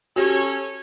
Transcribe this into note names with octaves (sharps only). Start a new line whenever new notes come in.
C#4 F#4 G4 A4 C#5